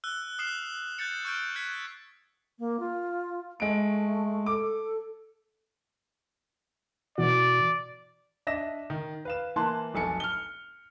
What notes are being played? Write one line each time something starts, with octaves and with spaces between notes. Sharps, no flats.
E6 F#6 G7
D#6 F6 C7 E7 F#7 G7
F#6 G6 A6 C#7
C#6 E6 F6 G6 D7
F#6 G#6 B6 C#7
A#3
F4
G#3 A3 D7
A4 D6
B2 E3 F#4 D5
D4 D#5 E5 A#6 E7
D#3
B4 F5 E7
E3 A#3 A5 C6 F#6
F1 B1 A4 G#5 C#7
F6 G7